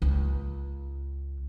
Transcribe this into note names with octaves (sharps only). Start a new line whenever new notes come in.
C#2